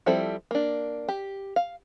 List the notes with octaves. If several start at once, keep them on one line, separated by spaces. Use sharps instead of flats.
F3 G3 C4 E4 A4
A#3 D4
G4
F5